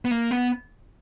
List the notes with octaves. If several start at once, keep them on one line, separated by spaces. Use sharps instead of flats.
B3
A#3
B3